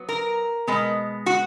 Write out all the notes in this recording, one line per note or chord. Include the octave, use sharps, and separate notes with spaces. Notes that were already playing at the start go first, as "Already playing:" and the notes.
Already playing: F#3 B3
A#4
B2 G#3 B3
F#4